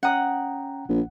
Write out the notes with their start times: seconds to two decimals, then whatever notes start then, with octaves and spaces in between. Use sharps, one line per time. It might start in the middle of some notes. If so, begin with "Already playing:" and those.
0.03 C#4 F#5 G5 A#5 D#6
0.89 A#1